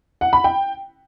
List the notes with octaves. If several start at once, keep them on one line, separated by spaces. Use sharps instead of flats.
F#5
B5
G5